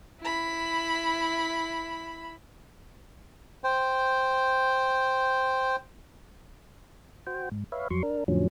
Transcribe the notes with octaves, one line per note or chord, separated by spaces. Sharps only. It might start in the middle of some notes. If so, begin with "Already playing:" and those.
E4 B5
C5 G5
F#4 C5 G5
G#2
B4 C#5 E5 F5
F2 F#3 C6 C#6
D4 A#4
F2 A2 D3 F3 F#3 C#4